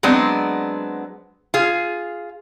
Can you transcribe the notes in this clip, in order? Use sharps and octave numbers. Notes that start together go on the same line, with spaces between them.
F#3 G#3 B3 C4 D4
F4 G#4